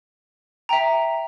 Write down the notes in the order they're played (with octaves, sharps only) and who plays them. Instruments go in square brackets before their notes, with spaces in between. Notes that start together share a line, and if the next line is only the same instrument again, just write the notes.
[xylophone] E5 G5 A#5